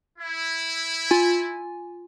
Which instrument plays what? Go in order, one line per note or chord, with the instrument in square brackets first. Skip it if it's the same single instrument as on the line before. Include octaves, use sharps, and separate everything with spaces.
[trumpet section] E4
[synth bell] F4 G#5